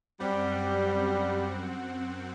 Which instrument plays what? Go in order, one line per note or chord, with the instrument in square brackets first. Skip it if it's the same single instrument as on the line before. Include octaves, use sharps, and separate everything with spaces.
[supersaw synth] F#2 C4 F#5 [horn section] G3